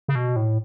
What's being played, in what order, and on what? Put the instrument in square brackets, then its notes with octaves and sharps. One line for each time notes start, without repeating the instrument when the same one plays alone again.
[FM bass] C#3
B2
A2